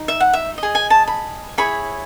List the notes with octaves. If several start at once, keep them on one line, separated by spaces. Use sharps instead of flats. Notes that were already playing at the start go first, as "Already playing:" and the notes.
Already playing: D#4
E5
F#5
E5
G#4 D#5
G#5
A5
B5
E4 G#4 C#5 B5